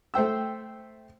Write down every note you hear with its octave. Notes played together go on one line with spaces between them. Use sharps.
A3 C5 G5 E6